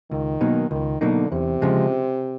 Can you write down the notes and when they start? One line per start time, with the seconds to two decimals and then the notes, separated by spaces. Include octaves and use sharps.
0.11 C#2 D#3
0.41 B2 F#3 A#3 D#4
0.71 C#2 D#3
1.01 B2 D3 F#3 A#3 D#4
1.31 E2 C3
1.62 C#3 F3 G#3